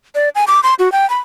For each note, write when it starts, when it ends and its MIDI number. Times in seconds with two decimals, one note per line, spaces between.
0.15 0.29 74
0.35 0.45 80
0.47 0.60 86
0.63 0.74 84
0.79 0.91 66
0.92 1.08 79
1.10 1.18 83